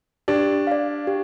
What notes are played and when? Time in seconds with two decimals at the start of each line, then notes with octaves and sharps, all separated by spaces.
0.28 D4 G4
0.67 D5 F5
1.07 G4